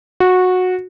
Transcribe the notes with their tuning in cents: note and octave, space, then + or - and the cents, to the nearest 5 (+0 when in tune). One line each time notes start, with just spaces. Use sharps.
F#4 -15